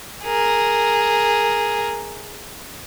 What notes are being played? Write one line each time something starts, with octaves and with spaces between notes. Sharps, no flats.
G#4 A#4